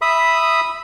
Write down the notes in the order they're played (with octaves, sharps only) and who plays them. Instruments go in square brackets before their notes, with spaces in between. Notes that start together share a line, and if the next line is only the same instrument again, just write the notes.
[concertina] E5 B5 D#6